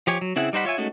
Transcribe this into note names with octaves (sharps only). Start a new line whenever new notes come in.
F3 G4 C#5 G#5
F#3
C#3 C4 E4 G#4 F#5
G3 D#4 C5 F#5 B5
F4 C#5 E5 G#5
G#3 A3 C#4 D#4 F#4